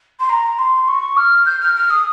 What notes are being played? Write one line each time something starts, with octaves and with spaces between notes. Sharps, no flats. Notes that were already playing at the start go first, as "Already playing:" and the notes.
C6
A#5
C6
C#6
F6
G6
F6
F6
D#6